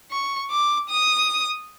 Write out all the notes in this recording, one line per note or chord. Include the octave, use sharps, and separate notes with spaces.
C#6
D6
D#6